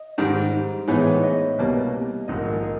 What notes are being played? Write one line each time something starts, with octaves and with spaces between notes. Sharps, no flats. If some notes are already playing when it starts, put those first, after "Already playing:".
Already playing: D#5
G#2 D#3 G3 C5
A2 E3 G#3 B3 D#4 C#5
D#5
C2 B2 G3 A#3
A#1 G#2 D#3 D#5
A#4
G#4
A#4
G#4